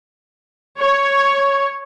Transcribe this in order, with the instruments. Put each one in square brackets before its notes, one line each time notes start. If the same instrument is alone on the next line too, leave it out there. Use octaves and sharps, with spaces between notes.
[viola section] C#5